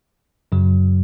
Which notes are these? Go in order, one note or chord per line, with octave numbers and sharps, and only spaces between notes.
F#2 C#3 F#3